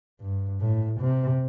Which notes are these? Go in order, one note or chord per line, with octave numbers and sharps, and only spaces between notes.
G2
A2
C3